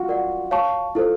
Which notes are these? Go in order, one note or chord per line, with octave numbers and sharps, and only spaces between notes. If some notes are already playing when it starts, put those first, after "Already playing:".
Already playing: F4 F#4
A#4 D5 F#5
C#5 F5 A5 C#6
E4 F4 A4 C5